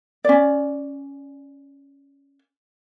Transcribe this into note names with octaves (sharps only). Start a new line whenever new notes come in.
C#4 D5